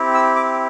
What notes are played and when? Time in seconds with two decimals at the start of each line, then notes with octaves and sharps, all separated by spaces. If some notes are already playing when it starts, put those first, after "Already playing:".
Already playing: C4 E4 G4
0.14 E6
0.36 D6